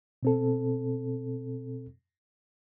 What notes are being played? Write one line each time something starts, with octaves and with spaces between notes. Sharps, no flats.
B2 C4 A4